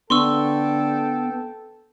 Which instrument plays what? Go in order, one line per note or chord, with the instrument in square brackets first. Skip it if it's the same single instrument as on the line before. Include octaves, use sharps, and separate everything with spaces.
[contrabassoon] D3 [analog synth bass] B3 [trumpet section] A4 G5 [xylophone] C6 C#6 E6